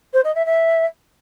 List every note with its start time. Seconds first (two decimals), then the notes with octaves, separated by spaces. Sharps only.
0.13 C5
0.24 D#5
0.35 E5
0.46 E5